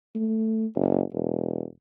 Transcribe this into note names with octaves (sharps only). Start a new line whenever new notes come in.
A3
F#1
E1